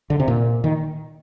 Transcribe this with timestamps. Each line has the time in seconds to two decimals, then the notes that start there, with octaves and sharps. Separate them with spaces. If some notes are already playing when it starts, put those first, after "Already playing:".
0.10 D3
0.20 C3
0.28 A#2
0.64 D#3